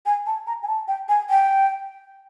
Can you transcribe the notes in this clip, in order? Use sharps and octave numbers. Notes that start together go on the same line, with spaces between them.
G#5
A5
A#5
G#5
A5
G5
G#5
G5